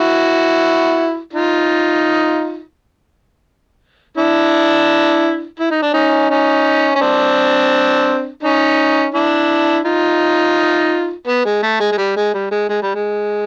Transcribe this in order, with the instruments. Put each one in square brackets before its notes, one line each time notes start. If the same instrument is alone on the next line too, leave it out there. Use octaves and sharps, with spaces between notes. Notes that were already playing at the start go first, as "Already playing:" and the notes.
Already playing: [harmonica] E4 F#4
D#4 F4
D4 E4
E4
D#4
D4
C#4 D#4
C#4 D#4
C#4
C4 D4
C#4 D#4
D4 E4
D#4 F4
B3
G#3
A3
G#3
G#3
G3
G#3
G3
G#3
G#3
G3
G#3